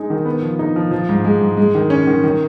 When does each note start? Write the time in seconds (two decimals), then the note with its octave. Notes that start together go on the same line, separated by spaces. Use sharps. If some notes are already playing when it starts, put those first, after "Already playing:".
Already playing: G#3 D#4 G#4
0.10 D#3
0.25 B3
0.42 F3
0.59 D#4
0.76 F3
0.91 F3
1.09 G#2
1.24 G#3
1.41 G#2
1.57 G#3
1.75 D#3
1.90 C#4
2.07 D#3
2.24 D#3